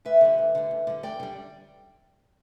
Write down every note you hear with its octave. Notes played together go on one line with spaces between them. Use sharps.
D2 B4 E5
D3 G3
D2
D3 G3
E2
D3 G3
E2 D5 G5
D3 G3